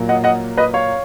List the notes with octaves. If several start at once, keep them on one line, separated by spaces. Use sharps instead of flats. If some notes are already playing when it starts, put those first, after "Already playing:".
Already playing: A#2 F#3 A#3
D#5 F#5
D#5 F#5
B4 D#5
C#5 F5